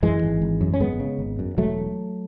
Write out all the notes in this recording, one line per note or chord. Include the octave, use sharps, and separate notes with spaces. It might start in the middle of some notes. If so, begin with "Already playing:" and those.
F#2 E3 G#3
G#1
G#1
F#2
C#4
G#1 G#3 B3
C#3
G#1
F#2
E1 F#3 A3